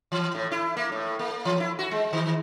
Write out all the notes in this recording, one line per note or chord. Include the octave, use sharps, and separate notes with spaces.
E3
A2
E4
A#3
A2
A#3
E3
E4
F#4
G#3
D#3